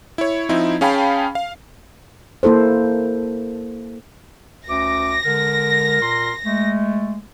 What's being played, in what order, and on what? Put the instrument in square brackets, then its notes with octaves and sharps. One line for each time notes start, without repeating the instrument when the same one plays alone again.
[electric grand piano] E4 C#5
F3 C4 D#4 E4
C#4 G#4 F5 G5 A5 B5
F5
[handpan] A#3 E4 A4 C5
[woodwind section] D2 C#4 D6 [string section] A#6
[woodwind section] D3 G#3 A#4
A#2 A#4 C6
G#3 A3